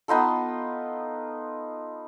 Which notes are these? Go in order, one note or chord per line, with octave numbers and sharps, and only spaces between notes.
B3 D#4 F4 A4